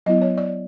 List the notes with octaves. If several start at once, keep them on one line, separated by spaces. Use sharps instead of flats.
F#3 B3 E4 D#5
C#5
D5